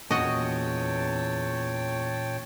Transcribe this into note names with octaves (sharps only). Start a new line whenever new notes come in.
E2 A#2 C#4 F#4 C#5 D#5 G5 A5